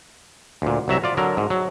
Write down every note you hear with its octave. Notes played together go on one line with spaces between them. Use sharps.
D2 A#2
C2 F#3 E5 A#5
F4 D5
D3 F#3 A#4
G#2
F#3